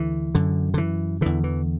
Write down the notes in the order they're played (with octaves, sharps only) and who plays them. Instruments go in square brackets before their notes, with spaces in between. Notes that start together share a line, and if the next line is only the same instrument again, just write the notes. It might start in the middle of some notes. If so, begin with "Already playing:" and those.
Already playing: [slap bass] D2 D3 E3
F#2 D3
D3
E3
E2 D3 E3
E3